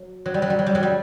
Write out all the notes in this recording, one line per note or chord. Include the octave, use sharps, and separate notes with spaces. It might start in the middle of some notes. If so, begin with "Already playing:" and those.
Already playing: F#3
F#3
G3
F#3
G3
F#3
G3
F#3
G3